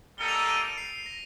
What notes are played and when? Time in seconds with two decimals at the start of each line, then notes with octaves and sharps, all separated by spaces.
0.18 G3 A#3 D#4 A4 G7
0.28 F7
0.39 D#7
0.48 D7
0.62 D7
0.78 C7
1.06 A#6